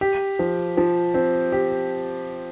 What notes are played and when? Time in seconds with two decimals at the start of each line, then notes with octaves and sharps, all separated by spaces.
0.01 G4
0.39 F3
0.77 F3
1.14 C4
1.52 G4